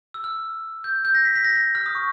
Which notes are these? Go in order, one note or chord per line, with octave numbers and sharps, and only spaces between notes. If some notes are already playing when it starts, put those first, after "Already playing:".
E6
F6
G6
G6
A#6
B6
B6
A#6
A#6
F6
D#6
C#6